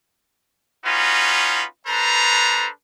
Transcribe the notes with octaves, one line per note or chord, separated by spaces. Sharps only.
C#4 D#4 F4 F#4 B4
D4 A4 B4 C5 A#5